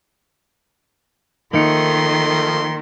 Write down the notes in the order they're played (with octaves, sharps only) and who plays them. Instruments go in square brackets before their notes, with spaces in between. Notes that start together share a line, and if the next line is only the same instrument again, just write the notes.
[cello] D#3 [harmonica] F3 A3 C6 [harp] A#3 D#4 C#7